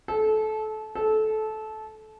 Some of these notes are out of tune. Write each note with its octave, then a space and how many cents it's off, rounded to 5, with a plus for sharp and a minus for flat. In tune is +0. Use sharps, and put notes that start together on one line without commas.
A4 -25
A4 -20